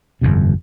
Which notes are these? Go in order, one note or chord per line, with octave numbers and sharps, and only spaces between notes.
G1 F2 C3